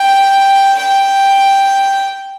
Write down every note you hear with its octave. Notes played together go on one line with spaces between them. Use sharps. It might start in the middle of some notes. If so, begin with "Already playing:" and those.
Already playing: G5
G5